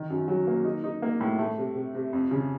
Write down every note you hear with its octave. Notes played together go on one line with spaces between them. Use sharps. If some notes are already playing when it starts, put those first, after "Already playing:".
Already playing: D#3
F#2
F#3
A#3
D#4
D#4
A#3
A2
A3
C3
C3
C3
F2
C#3